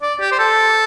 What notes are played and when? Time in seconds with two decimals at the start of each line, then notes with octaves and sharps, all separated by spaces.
0.02 D5
0.21 G4
0.32 C5
0.39 A4